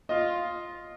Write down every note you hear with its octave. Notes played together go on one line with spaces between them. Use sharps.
F4 D#5